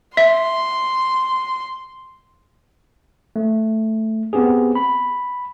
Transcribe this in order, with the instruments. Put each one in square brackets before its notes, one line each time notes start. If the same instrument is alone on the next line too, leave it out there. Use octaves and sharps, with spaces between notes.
[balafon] E5 [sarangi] C6
[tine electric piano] A3
B3 C4 G4 G#4
B5